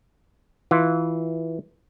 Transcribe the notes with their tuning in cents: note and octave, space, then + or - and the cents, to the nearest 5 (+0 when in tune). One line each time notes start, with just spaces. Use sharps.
E3 -10 F4 +0